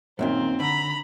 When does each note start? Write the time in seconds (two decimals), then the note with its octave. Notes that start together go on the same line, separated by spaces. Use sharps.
0.19 F#2 A#2 D#3 C4
0.60 D3 A#5 B5